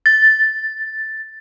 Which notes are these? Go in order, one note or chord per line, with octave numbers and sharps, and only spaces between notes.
A6